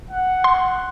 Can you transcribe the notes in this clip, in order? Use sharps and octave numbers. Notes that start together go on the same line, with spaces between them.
F#5
C6